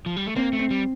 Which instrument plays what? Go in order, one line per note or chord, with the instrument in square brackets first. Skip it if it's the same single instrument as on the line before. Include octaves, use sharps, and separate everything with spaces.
[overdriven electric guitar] F3
G3
A3
[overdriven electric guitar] A#3 [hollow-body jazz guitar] C4
[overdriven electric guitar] A3
[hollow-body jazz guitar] C4
[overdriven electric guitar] G3